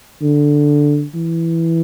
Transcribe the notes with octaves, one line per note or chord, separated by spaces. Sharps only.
D3
E3